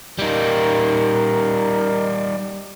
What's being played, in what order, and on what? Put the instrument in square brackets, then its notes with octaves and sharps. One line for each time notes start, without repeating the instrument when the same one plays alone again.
[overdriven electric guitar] G3 D#4 [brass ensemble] A#4